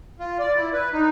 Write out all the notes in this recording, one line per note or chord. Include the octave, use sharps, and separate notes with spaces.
F4
D5
E4
B4
D#4